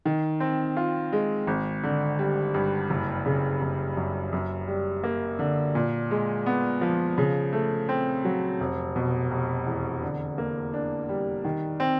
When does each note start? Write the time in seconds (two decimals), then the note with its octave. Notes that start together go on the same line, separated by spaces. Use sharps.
0.06 D#3
0.40 C4
0.77 F4
1.13 G#3
1.47 G#1
1.83 D3
2.19 G3
2.54 G2
2.90 F#1
3.26 C#3
3.61 F#1
3.97 F#2
4.33 F#2
4.68 G3
5.04 A#3
5.39 D3
5.75 A#2
6.11 G#3
6.46 B3
6.81 F3
7.18 C#3
7.53 A3
7.89 C4
8.25 F#3
8.60 F1
8.96 B2
9.31 F1
9.66 E2
10.03 D3
10.38 A#3
10.74 D4
11.09 G3
11.45 D#3
11.80 C4